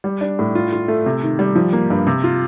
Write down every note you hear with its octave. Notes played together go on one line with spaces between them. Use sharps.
G3
D4
A2
F4
F4
A3
C3
D#3
G3
F3
A#3
G2
C3
F4